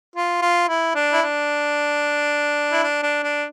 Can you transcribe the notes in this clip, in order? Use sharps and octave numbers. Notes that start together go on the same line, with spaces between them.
F4
F4
E4
D4
E4
D4
E4
D4
D4
D4